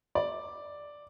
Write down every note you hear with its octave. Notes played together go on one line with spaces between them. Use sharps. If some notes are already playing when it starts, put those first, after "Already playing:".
D5